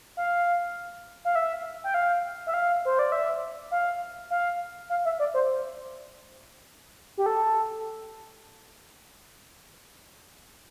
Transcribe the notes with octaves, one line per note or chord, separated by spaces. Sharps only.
F5
F5
E5
G5
F5
E5
F5
C5
D5
E5
F5
F5
F5
E5
D5
C5
G4
A4